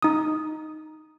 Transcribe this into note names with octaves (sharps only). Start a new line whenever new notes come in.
D#4 D#6